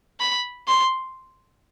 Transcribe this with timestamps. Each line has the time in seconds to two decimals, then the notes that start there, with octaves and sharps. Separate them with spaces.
0.20 B5
0.68 C6